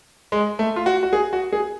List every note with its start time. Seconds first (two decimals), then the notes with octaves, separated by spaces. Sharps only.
0.32 G#3
0.59 A3
0.76 F4
0.86 F#4
1.03 F#4
1.13 G#4
1.33 F#4
1.52 G#4